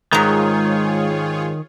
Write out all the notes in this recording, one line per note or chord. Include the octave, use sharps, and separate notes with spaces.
G#2 D#3 G#3 F4 G#4 C#5 A#5